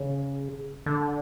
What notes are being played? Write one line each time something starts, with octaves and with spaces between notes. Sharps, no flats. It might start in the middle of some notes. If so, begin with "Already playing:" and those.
Already playing: C#3
D3